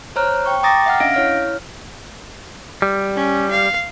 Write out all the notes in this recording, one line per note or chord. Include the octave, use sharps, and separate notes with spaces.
C5 C#5 A#5 F6 F#6
G5 C#6
G5 A#5 D6 D#6 A6 A#6
E5 F#5 F6
C#4 D4 D#5 F5 A#6 D7
E4 C#5 F6
G3
C#4
F5